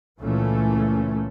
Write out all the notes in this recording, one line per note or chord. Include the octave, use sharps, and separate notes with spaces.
C#2 A#2 E3 A3 C#4